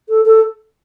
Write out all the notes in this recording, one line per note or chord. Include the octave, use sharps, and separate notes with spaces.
A4
A4